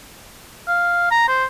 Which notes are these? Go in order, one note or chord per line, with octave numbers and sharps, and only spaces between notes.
F5
A#5
C5